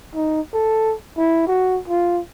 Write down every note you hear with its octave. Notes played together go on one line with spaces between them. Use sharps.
D#4
A4
E4
F#4
F4